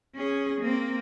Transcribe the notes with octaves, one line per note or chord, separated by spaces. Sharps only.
C#4 G#4
A#3 C4